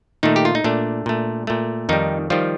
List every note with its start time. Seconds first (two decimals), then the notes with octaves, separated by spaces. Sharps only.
0.23 A#2 D#3 A3 D#4
0.36 G4
0.45 F4
0.55 D#4
0.64 A#2 A3 D4
1.06 A#2 A3
1.47 A#2 A3
1.89 F2 D#3 G3 D#4
2.30 D#3 F3 G3 F4